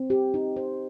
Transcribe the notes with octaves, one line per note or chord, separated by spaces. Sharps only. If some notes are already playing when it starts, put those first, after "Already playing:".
Already playing: C4
G4
D#4
C5